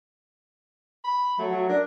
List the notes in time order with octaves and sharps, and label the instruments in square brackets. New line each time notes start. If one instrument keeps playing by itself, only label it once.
[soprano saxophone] B5
[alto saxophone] F#3 [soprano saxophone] A3
[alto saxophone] F#3
[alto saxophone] D4 [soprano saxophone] A#4